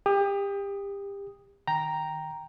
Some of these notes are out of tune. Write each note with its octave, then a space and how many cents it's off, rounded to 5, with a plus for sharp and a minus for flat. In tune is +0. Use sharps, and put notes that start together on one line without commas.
G4 +30 D#6 +0
D#3 +0 G5 +0 A#5 +0